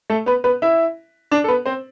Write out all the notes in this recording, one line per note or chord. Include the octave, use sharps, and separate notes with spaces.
A3 A4
B3 B4
B3 B4
E4 E5
D4 D5
A4
B3 B4
C4 C5